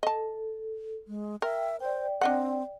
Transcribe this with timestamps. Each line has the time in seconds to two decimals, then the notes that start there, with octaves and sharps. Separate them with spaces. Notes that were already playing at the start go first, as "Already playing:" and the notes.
0.03 A4 D#5 A5
1.07 G#3
1.42 A#4 E5 G5
1.80 C5 D5 G5
2.21 C4 D4 D#5 F#5